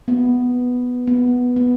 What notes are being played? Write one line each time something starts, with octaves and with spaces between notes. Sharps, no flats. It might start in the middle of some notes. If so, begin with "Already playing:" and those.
B3
B3
B3